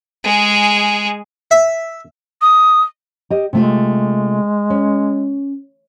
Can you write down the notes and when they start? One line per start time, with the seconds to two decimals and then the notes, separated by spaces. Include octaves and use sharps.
0.24 G#3 G#4
1.51 E5
2.42 D#6
3.30 G4 D#5
3.53 C3 G#3 A3 F4
4.70 C#4